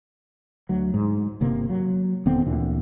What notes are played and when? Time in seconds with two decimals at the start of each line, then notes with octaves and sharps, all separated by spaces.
0.69 D2 F#3
0.94 G#2
1.41 G1 C3 A#3
1.70 F#3
2.26 D#1 D3 B3 C4
2.46 D2 A#2 D3 E3